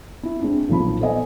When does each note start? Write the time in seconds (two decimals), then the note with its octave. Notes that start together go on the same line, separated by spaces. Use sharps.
0.23 E4
0.41 G#3 C4 D4 E4
0.69 B1 A#2 F3 B5
1.00 B3 A4 C5 D5 D#5 G#5